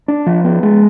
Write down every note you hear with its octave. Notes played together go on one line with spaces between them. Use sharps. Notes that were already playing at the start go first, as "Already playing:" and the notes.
D4
F3
B3
G#3